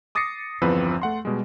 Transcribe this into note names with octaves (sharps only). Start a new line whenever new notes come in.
D6 D#6 A6 A#6 C7 C#7
G1 E2 F3 C4 B4 E6
A3 F#5 C6
B2 G3 G#3